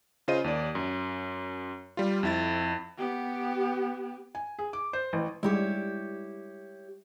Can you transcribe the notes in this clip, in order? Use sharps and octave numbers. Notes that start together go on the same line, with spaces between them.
C#3 F4 C5 D#5 D#7
D#2 D5
F#2
G3 F4
F2 E4 A6
B3 G4
G#5
G#4
D6
C5
A1
G3 G#3 E4 G4 C#5